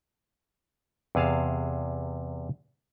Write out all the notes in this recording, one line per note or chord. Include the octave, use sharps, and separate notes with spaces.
E2 C3 G#4 F5 A5